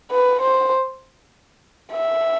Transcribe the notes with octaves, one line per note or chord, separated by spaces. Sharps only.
B4
C5
E5